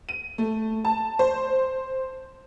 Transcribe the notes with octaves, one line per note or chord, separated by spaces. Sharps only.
D#7
A3
A5
C5